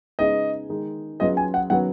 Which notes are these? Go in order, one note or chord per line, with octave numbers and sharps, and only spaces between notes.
C#3 G#3 D#4 G#4 B4 D#5
D#3 G#3 D#4
F#3 C#4 F4 G#4 B4 D#5
G#5
F#5
D#3 F#3 C#4 F#4 B4 F#5